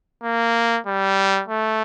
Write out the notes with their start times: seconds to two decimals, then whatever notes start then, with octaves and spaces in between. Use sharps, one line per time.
0.24 A#3
0.87 G3
1.49 A3